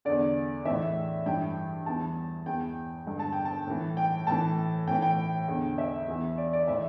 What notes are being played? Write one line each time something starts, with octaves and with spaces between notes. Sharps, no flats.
E2 D3 D5
A2 E3 E5
G2 E3 G5
E2 E3 A5
E2 E3 G5
G2 D3
A5
G5
A5
A2 E3
G5
A2 E3 A5
A2 E3 G5
G5
E2 D3
E5
E2 E3
D5
D5
A2 E3 E5